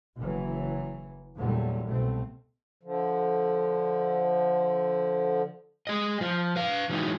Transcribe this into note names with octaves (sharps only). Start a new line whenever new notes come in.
F#1 E3 F#3
E2 A#2 D3 F#3 G3 A3
C2 B2 A3 C4
D3 F3
G#3 G#4 D#5
F3 F4
B4 F5
E3 F#3 G#3 A3 D#4